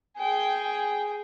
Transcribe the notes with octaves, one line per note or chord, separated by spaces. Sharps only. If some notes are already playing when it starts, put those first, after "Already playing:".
G#4 G5